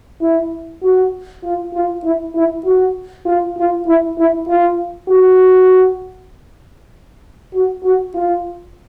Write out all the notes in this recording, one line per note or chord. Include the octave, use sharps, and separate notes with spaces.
E4
F#4
F4
F4
E4
E4
F#4
F4
F4
E4
E4
F4
F#4
F#4
F#4
F4